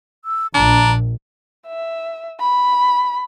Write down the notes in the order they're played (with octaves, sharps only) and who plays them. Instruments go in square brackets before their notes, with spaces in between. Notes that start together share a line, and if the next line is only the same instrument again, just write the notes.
[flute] E6
[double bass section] A#1 [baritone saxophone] D4 [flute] A#5
[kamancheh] E5
B5